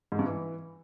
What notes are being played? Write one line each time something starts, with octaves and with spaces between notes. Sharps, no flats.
G#2
G2
E3